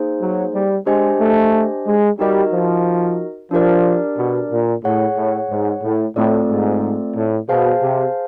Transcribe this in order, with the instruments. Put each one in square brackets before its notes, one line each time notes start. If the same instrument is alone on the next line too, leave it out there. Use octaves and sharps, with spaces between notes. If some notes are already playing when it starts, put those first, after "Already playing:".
Already playing: [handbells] A#3 D#4 G#4 C5
[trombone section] F#3
G3
[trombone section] G#3 [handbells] D4 G4 C5 D#5 G#5
[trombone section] A3
G#3
[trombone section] G3 [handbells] D#4 F#4 A#4 D#5
[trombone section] F3
[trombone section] F3 [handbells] D4 G4 A#4 D5
[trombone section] B2
A#2
[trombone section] A2 [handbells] G#4 C#5 F#5
[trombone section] A2
G#2
A2
[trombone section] A2 [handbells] A3 C4 F4 A4 D5
[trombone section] G#2
A2
[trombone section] B2 [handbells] G#4 C5 F5 A5
[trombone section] C3